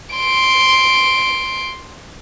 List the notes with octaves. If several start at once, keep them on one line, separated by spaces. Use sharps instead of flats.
C6 D7